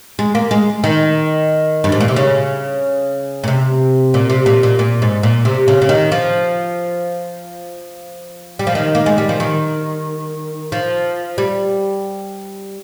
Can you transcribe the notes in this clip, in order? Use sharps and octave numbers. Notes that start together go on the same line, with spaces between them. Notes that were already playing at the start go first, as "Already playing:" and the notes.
G#3
A#3
G#3
D#3
G2
G#2
A#2
C3
C#3
A#2
C3
A#2
C3
A#2
A#2
A#2
G#2
A#2
C3
C#3
C#3
D#3
F3
G3
F3
D#3
A#3
G#3
G3
F3
D#3
F3
G3